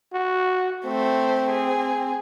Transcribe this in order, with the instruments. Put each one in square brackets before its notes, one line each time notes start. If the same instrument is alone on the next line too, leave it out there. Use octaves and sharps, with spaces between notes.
[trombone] F#4
[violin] A3 C5 [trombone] C4
[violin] G#4